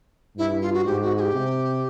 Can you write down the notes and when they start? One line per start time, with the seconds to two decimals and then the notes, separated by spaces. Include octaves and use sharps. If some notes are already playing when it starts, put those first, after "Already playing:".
0.37 G2 E4
0.62 F4
0.74 F#4
0.85 G#2 G4
1.02 F#4
1.17 G#4
1.21 G4
1.33 C3